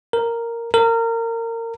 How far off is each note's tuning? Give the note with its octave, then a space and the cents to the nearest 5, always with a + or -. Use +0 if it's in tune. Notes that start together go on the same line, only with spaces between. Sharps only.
A#4 -5
A#4 -25